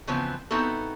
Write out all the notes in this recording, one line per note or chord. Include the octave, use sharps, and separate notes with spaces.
C#3 E3 F3 B3 C4
B3 C4 D#4 E4 F#4 A4